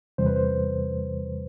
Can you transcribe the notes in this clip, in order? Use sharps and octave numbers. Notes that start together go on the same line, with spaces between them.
E2 C3 E3 G3 C5
B4
C5